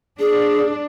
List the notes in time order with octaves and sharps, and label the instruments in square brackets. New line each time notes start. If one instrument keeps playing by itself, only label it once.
[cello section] D4 [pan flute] G#4